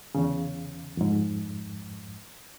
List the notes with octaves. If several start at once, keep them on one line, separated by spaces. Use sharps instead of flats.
E2 C#3
F2 G#2